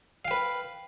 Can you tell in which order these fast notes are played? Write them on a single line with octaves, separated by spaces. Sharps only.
F5 G5 B4